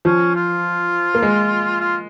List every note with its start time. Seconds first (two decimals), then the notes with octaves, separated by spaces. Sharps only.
0.05 F3 C#4
0.35 F4
1.15 A#3
1.22 G#3
1.80 F4